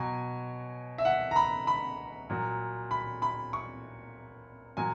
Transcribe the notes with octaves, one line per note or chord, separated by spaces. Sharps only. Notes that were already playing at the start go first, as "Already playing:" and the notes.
Already playing: B2 F#3 G#5
E5
F#5
A#5
B5
B5
A#2 F#3
B5
B5
C#6
A#2 F#3 G#5